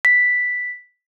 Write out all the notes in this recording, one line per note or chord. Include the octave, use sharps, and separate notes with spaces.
B6